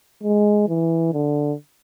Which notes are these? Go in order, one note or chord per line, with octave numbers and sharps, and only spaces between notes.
G#3
E3
D3